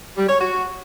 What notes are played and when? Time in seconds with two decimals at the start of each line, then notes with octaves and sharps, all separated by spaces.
0.18 G3
0.29 C#5
0.41 F#4